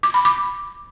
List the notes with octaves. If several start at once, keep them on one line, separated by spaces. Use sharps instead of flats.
D6
B5
D6